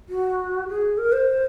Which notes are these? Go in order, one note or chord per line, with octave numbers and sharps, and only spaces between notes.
F#4
G#4
A#4
C5